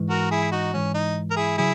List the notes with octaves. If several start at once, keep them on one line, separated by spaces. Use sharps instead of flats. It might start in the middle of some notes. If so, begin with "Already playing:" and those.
Already playing: G#2 E3 G#3
F#4 A#4
E4 G#4
D#4 F#4
G#2 E3 G#3 C#4
D#4
A#4
E4 G#4
C#3 F#3 E4 G#4